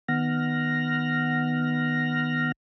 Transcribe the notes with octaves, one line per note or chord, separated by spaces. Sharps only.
D#3 B3 F#5 F6 A#6